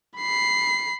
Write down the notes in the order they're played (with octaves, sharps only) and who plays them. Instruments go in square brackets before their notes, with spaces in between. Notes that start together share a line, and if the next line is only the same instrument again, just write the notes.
[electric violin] B5 C7